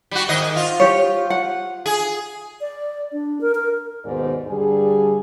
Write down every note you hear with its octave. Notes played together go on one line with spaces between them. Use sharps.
G3 F#4
G#2 D#3 D#5
F4
G4 C#5
F#5
G#4
D5
D4
A#4
A#4
D#2 G#2 B2 D#3 C5 D5
G2 D3 G3 D4 G#4